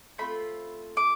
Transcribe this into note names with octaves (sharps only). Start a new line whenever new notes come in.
A3 C4 F4 B5
D6